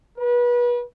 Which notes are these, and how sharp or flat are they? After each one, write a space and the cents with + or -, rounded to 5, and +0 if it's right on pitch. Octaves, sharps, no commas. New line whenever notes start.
B4 -30